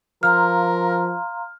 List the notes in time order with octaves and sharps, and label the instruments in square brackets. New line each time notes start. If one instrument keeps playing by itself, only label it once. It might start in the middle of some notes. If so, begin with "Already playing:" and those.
[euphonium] F3 [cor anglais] A#4 [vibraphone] F5 A#5 C6 [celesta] F6